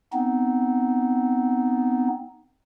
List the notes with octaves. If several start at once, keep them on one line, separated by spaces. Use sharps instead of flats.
B3 C4 D#4